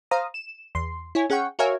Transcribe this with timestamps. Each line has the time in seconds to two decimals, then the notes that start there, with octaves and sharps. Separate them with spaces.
0.11 C5 F5 A#5 D#6
0.34 E7
0.75 E2 C6
1.15 E4 C#5 G#5
1.30 C#4 G#4 F#5 G5 C#6
1.59 F#4 A#4 C#5 E5 F5 G#5